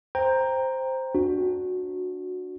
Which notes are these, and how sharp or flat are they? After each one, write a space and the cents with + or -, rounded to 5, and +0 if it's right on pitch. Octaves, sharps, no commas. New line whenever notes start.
C5 +0 G5 +15 A#5 +0
D4 +0 F#4 -15